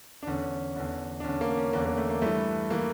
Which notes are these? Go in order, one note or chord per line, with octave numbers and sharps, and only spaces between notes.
D4
E2 D3 C#4
E2 D3
D4
E2 D3 C#4
A#3
C#4
E2 D3 A#3
A#3
A3
A#3
G2 E3 A3
E3 A#3